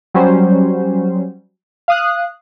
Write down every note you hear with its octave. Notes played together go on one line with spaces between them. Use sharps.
F#3 G3 C#4 C5
F5 D#6 F#6